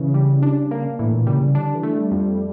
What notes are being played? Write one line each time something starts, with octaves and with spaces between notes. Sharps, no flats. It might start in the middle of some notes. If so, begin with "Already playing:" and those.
Already playing: C#3 E3
G3
D4
A#3
A2 E3
A#2
C#3 G3
C#3
D3 D4
E3
A3
G3
F2